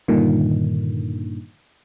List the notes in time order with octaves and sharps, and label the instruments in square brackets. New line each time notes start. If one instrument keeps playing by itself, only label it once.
[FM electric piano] G2 A#2 D3 D#3